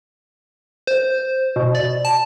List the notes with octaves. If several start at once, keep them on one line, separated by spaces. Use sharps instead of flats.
C5
B2
D5
A5